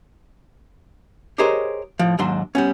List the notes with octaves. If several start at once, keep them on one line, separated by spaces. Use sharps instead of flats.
G4 G#4 A#4 C5 C#5 D#5
A2 F3
D#2 G#2 F#3 D4 C6
G3 B3 C#4